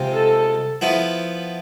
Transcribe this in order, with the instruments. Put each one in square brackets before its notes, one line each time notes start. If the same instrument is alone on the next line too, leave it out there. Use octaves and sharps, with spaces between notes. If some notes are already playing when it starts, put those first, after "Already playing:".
Already playing: [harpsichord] C3 G#3 C4 F4
[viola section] A4
[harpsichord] F3 B3 E4